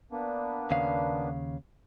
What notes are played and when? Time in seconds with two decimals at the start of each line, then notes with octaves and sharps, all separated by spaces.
0.12 A#3 B3 D4
0.71 D#2 C#3 F5